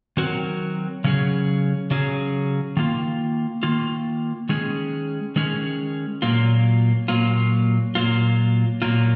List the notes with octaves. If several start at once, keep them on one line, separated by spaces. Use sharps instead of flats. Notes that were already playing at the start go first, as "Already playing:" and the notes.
D#3 F#3 C4 F#4 A#4
C#3 F#3 C#4 G#4
C#3 F#3 C#4 G#4
D#3 A#3 F4
D#3 A#3 F4
D#3 G#3 C#4 G#4
D#3 G#3 C#4 G#4
A#2 F#3 A#3 F4
A#2 F#3 A#3 F4
A#2 F#3 A#3 F4
A#2 F#3 A#3 F4